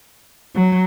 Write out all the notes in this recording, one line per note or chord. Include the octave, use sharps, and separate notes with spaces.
F#3